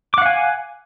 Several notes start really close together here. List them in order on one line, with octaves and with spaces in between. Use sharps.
D6 F#5 F5 G#5